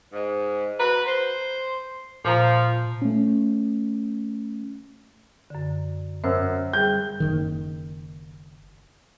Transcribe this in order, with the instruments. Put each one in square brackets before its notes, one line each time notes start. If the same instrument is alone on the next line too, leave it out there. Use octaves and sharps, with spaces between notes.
[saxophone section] G#2
[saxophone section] F#4 B4 [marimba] A#5
[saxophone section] C5
[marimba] A#2 A#5 [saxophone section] F3
[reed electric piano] A3 C#4
[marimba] F#2 D3
[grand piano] F#2 [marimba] C5 E6
[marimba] G3 G#4 G5 [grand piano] G6
[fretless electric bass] F#1 C2 D#3